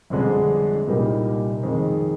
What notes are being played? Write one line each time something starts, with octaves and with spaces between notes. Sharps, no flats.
G1 F2 D3 G#3 D4
C2 A#2 G3 A#3 D#4
F2 D#3 G#3